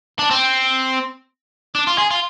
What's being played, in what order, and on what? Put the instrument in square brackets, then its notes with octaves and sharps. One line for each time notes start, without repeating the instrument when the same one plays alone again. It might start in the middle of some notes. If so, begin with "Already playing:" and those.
[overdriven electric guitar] D4
C4
D4
F4
G#4
F4